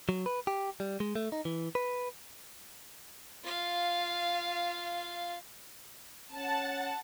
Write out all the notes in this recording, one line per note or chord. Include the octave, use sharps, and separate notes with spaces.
F#3
B4
G4
G3
G#3
A3
D#4
E3
B4
F4 F5
C#4 F#5 A5 A6